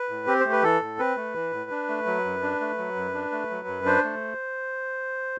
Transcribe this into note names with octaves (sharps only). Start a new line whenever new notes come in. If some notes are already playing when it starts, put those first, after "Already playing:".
Already playing: B4
A2
C4 G4
A3 C5
B4
E3 A4
A2
C4 B4
A3
E3
A2
D4
A3
F#3
F#2
D4
A3
F#3
F#2
D4
A3
F#3
F#2
D4 C5
A3